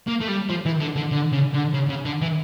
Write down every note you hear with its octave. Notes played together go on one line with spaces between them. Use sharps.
A#3
A3
G3
F3
E3
D3
D3
D3
C#3
D3
C#3
C#3
D3
E3